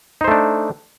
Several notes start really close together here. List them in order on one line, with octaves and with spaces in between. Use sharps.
D#4 C5 A3 D4